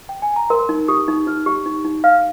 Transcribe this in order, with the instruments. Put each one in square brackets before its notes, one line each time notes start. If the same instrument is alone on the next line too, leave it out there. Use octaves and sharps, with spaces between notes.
[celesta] G5
G#5
A#5
[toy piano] A#4 [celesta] C6
[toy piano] D#4
[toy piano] G4 [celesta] D#6
[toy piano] D#4
[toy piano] D#4 [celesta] F6
[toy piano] G4
D#4
D#4
[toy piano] F5 [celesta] F6